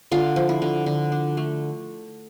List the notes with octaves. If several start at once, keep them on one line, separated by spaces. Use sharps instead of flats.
D3 F4
F3
E4
D3
D3
D4
A3